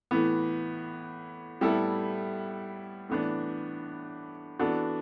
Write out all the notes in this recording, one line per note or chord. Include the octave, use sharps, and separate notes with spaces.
A2 E3 B3
A2 G3 B3 E4 A4
A2 E3 B3 D4
E3 B3 D4 F#4 A4